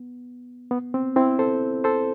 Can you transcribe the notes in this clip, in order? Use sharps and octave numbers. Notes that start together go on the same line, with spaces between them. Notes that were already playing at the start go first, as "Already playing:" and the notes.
Already playing: B3
B3
C4
C4 E4
A4 C5
A4 C5